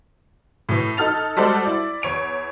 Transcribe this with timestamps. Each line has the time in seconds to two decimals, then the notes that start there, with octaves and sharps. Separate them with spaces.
0.69 A2 E3
0.97 D#4 A4 F6 A6 F7
1.37 G3 G#3 F#4 A4 C5 D5
1.64 E4 D5
2.02 E2 C#5 D7 F7